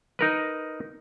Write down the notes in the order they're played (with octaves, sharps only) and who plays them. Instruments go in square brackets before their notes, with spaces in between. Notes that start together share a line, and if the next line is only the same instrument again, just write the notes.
[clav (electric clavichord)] D#4 A#4 B4